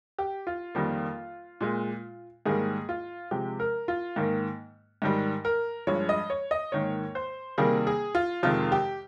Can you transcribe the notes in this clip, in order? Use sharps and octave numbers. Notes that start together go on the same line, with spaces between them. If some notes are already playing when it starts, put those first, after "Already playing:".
G4
F4
F2 D#3 G3 A#3
A#2 G#3
G#2 D#3 G3 A#3 G#4
F4
C3 F3 G#3 G4
A#4
F4
G#2 D#3 A#3
G#2 D#3 G3
A#4
G2 F3 G#3 C#5
D#5
C#5
D#5
G#2 D#3 A#3 C#5
C5
C3 D#3 G3 A#3 G#4
G#4
F4
F2 C3 D#3 G#3 F4
G4